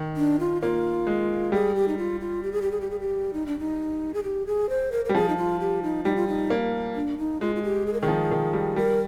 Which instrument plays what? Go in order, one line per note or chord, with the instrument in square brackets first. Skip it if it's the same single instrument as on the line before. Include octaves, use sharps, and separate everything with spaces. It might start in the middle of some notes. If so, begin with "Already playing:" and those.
Already playing: [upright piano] D#3
[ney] D4
F4
[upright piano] A#3 [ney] F4
[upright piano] G#3
[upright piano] G3 [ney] G#4
[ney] G4
D#4
F4
F4
G4
G#4
G4
G#4
G4
G#4
G4
D#4
D4
D#4
G#4
G4
G#4
C5
A#4
[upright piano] G3 [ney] A#4
[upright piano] F3 [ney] G#4
[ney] D#4
F4
G4
D#4
[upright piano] G3 [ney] D#4
[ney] F4
D#4
[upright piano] A#3
[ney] D4
D#4
[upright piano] G#3 [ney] F4
[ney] F4
G4
G#4
A#4
[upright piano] D#3 [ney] G#4
[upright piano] F3
D#3
G3
[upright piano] G3 [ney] A#4